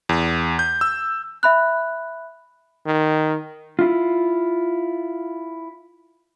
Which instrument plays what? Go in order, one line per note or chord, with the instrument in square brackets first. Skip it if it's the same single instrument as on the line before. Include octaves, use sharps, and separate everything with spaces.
[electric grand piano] E2
G6
E6
[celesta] E5 B5 F#6
[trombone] D#3
[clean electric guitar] E4 F4